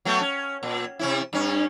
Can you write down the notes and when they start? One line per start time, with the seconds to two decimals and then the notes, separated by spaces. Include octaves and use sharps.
0.05 F#3 A3 B3
0.21 C#4
0.63 A#2
0.99 C3 C#4 E4
1.33 G2 C#4